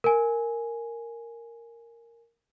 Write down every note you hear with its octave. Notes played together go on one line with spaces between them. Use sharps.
A#4 G#5